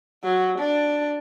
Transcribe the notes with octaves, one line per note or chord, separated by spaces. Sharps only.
F#3
D4